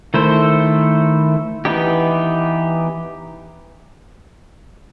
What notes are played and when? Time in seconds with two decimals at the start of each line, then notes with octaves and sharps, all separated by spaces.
0.14 D#3 A3 E4 A4 C5
1.65 E3 B3 D#4 G4